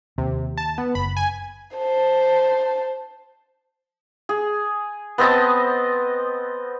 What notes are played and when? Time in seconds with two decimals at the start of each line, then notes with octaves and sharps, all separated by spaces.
0.18 D#2 C3
0.58 A5
0.78 B3
0.95 F#1 B5
1.17 G#5
1.77 C5 A5
4.29 G#4
5.18 B3 C4 D#5 A5